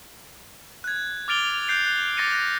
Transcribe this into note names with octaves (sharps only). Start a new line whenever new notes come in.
F#6 G#6
D6 F6 A6 D7 F7 G7
F#6 G6 C7 D7 F7
F#6
D6 A6 A#6 C#7 D#7
F#6 A#6